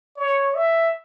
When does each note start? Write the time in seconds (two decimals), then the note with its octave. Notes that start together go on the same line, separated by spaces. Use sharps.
0.17 C#5
0.55 E5